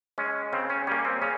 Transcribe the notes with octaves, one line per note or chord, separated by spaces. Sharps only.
G#3 C#4
C#3 C4
C#4
G3 A#3 C#4
C4
C#3 C#4